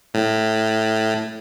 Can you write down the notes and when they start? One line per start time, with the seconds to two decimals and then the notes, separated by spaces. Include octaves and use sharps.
0.14 A2